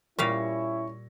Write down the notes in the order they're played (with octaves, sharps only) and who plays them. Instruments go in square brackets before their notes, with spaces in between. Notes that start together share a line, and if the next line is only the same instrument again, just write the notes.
[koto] A#2 G3 F5 [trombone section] C#4 E4 [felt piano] C#6 A#6